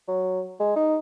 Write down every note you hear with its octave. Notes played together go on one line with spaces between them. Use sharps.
F#3
G#3
D#4